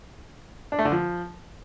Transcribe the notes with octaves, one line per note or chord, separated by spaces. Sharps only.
D4
A3
D3
F3